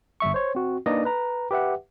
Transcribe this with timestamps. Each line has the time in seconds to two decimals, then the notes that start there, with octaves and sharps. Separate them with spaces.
0.20 G1 G3 E5 C#6
0.34 C5 C#5
0.55 C4 F#4
0.86 A#3 D4 D#4 B4 D5 D#5
1.05 B4 A#5
1.51 G4 B4 E5 F#5